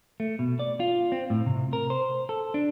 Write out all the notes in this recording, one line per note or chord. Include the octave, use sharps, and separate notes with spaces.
A3
B2
D5
F4
C4
A2
C3
A#4
C5
A4
D4